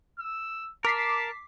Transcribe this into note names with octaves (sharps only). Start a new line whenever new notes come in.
E6
A#4 A5 D6 B6 C7